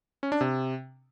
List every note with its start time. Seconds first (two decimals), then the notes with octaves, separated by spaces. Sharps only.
0.23 C#4
0.32 D4
0.41 C3